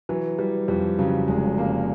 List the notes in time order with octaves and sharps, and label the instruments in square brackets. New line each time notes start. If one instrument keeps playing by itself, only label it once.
[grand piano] E3 F#3
E3 G3
F2 G3
C#3 F#3
F1 G#3
C#3 A#3